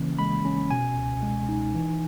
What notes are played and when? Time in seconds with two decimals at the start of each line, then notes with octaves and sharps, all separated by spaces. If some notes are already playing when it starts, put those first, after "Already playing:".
Already playing: C#3 E3 A#3 C#4
0.19 G#3 B5
0.45 C#4
0.71 B2 G#5
0.97 C#2
1.23 G#3
1.49 D#4
1.75 E3